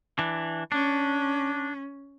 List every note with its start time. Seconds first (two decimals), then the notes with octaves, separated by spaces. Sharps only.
0.19 E3 D4
0.72 C#4 D4